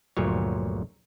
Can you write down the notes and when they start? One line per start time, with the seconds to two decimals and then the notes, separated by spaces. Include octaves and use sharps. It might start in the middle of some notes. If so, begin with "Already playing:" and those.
0.17 G1 D2 A#2 F3 F#3 C#5